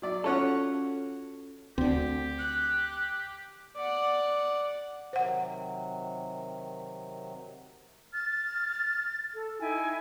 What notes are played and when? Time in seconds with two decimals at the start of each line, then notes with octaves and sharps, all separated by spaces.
0.02 F#3 D5 E5
0.24 C#4 F4 F#4 A4 C#5 F#5
1.78 D2 D3 C4 G4
2.38 F#6
3.76 D5 F#5
5.13 C3 D#3 F#3 C5 F#5
8.13 F6 A6
9.35 A4
9.60 D#4 E4 G5 G#5